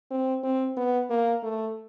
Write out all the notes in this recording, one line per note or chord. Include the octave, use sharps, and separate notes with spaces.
C4
C4
B3
A#3
A3